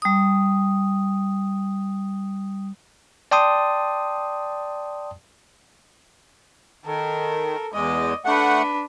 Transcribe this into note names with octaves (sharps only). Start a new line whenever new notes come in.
G3 D#6
D5 G5 A5 C6 D#6
D#3 A4 A#4
E2 G#3 D5 D#5
A3 D4 B4 F#5